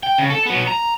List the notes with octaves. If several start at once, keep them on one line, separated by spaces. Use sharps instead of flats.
G5
C#3
A4
F#3 B3
A#5